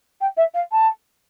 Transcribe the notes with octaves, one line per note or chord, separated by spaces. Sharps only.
G5
E5
F5
A5